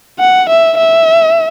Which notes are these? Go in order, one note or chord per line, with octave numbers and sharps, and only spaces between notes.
F#5
E5
E5